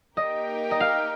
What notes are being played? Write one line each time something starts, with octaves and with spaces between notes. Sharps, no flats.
A#3 D#4 G4 A#4 D#5 G5
D#5
F5